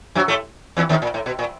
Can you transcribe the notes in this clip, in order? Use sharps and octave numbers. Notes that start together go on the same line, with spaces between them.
F#2 F#3
A2 A3
E2 E3
D#2 D#3
A#2
A2
B2
A#2